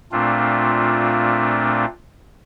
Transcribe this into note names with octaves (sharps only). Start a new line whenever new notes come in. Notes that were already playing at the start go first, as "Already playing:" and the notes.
A#2 A3 C4 D4 F4